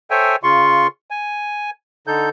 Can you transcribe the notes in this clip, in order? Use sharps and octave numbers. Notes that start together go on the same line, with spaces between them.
A4 C5 C#5 E5 G5 G#5
C#3 F4 C6 C#6
G#5
D3 D#4 A4 G6